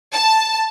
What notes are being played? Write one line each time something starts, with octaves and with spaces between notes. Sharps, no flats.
A5